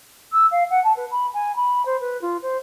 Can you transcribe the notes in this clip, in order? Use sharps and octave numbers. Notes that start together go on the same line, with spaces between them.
E6
F5
F#5
A5
B4
B5
G#5
B5
C5
B4
F4
C5